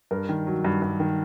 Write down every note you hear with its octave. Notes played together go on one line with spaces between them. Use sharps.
G2 A#4
D#3
F#3
G2
G2
D#3